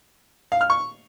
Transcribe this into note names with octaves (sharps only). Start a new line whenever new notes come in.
F5
F6
C#6